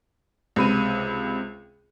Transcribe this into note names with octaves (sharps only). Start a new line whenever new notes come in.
C#2 C3 B5 D#7